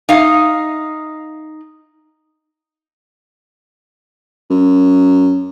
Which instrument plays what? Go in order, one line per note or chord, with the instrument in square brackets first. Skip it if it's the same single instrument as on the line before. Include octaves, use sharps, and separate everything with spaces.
[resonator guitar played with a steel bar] D#4 F5
[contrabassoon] F#2